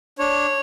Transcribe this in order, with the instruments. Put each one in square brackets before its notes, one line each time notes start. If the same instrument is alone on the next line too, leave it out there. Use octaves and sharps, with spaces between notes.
[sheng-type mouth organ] D4 C#5